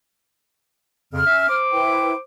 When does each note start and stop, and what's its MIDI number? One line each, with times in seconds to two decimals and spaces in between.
1.12 1.21 41
1.12 1.21 49
1.12 1.57 89
1.25 1.48 61
1.25 1.48 76
1.48 2.19 72
1.48 2.19 86
1.72 2.12 64
1.72 2.12 71
1.72 2.12 79